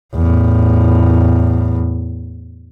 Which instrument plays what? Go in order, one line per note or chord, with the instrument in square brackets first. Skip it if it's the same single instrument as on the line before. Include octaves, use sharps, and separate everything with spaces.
[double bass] E2 A2